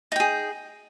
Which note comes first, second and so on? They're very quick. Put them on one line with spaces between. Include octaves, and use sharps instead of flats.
D#4 G5 G#4